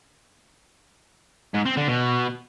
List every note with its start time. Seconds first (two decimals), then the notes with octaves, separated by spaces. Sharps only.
1.54 G#2
1.66 C4
1.77 D3
1.88 B2